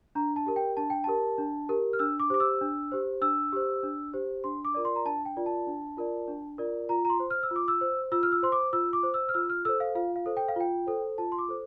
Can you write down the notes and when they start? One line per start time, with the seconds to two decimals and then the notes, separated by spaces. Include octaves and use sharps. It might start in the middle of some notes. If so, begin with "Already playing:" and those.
0.15 D4 A#5
0.36 A5
0.46 G4 A#4
0.56 G5
0.77 D4 A5
0.90 G5
1.04 G4 A#4 A5
1.38 D4
1.69 G4 A#4
1.93 F6
1.99 D4 E6
2.20 D6
2.30 G4 C5 D6
2.40 E6
2.61 D4
2.92 G4 C5
3.21 D4 E6
3.52 G4 C5
3.83 D4
4.14 G4 C5
4.44 D4 C6
4.65 D6
4.74 F4 A#4 D5
4.85 C6
4.96 A#5
5.05 D4 A5
5.25 G5
5.36 F4 A#4 D5
5.46 A5
5.67 D4
5.97 F4 A#4 D5
6.28 D4
6.58 F4 A#4 D5
6.89 F4 A#5
7.05 A#5
7.10 C6
7.20 C5
7.30 F6
7.43 E6
7.51 F4
7.56 D6
7.68 E6
7.81 C5
8.12 F4 E6
8.23 F6
8.32 E6
8.43 C5 C6
8.52 D6
8.73 F4 E6
8.93 D6
9.03 C5
9.14 E6
9.29 F6
9.34 F4 E6
9.50 F6
9.65 A4 C5 E6
9.80 F5
9.95 F4 F5
10.16 F5
10.26 A4 C5
10.37 G5
10.49 F5
10.56 F4 G5
10.87 A4 C5
11.18 F4 A5
11.32 C6
11.38 D6
11.49 A4 C5